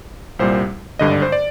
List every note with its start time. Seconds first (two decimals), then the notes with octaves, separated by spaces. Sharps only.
0.39 C2 A#2 G3 C5
0.99 G#1 G2 D3 D#5
1.11 D5
1.22 C5
1.32 D5